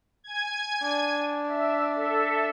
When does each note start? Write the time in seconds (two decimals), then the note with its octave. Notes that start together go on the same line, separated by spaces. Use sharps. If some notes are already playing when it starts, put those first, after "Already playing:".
0.24 G#5 G#6
0.83 D4
1.46 E5
1.94 A4 E5